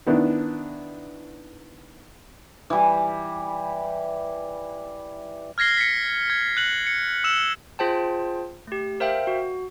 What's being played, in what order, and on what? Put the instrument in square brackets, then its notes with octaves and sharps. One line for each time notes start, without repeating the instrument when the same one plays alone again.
[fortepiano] D#3 B3 D4 E4
[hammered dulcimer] E3 G3
[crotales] F6 G#6 A#6 C7 G7
B6 C#7
G#6
F#6 F#7
C#7
E6 E7 F#7
[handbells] F4 G#4 C5 G5 A5
A3 G4
A#4 C5 E5 F5 G5
F#4